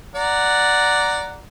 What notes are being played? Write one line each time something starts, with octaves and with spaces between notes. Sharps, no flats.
D5 F#5 A#5